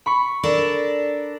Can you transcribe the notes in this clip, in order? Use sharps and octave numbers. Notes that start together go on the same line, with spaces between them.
B5 C#6
D4 A4 A#4